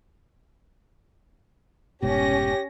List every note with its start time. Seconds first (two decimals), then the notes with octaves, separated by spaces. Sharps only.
2.02 F1 G#2 B2 C#4 G4 A#6